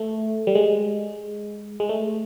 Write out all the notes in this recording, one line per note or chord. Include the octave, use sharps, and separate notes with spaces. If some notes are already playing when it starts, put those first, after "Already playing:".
Already playing: A3
G3
G#3
G#3
A3